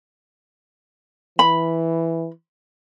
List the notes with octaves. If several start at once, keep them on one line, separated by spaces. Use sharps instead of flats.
E3 B5